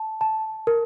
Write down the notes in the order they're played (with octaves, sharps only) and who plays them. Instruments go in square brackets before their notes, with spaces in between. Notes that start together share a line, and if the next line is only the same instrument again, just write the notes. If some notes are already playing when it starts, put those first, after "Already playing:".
Already playing: [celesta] A5
A5
A#4